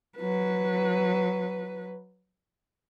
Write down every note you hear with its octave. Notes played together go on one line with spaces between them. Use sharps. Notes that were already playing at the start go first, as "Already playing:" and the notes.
F#3 B4